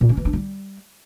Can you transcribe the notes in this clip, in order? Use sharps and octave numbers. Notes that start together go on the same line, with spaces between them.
A#2
C#4
E3
D4
G3